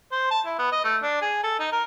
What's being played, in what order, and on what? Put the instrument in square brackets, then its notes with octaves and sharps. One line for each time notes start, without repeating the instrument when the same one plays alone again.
[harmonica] C5
A5
E4
B3
D#5
A3
D4
G#4
A4
D#4
A#4